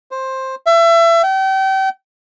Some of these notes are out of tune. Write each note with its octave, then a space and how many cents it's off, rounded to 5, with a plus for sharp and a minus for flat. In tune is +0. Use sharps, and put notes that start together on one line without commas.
C5 +10
E5 +30
G5 -35